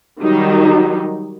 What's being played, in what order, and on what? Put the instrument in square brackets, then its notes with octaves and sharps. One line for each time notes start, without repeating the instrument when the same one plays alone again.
[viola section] D#3 F#3 G3 D#4